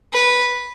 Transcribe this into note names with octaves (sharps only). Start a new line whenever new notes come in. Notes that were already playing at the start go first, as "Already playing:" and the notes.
B4